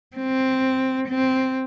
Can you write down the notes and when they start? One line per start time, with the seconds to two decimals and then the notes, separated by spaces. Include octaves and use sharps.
0.16 C4
1.08 C4